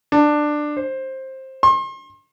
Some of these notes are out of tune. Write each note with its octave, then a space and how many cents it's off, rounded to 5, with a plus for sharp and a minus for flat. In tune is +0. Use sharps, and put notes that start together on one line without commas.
D4 +15
C5 +15
C6 +40